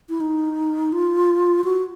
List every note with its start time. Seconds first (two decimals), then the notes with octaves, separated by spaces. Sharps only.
0.09 E4
0.20 D#4
0.93 F4
1.64 F#4